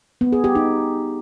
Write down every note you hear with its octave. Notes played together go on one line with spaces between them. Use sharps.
B3
G#4
G4
D#4